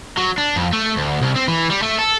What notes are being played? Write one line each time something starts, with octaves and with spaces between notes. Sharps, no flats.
F#3
D4
F2
A3
D2
C2
C4
E3
G3
A3
A4